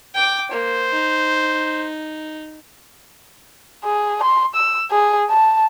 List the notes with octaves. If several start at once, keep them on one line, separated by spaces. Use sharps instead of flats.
G5 D6
A#3 C5
D#4
G#4
C6
E6
G#4
A5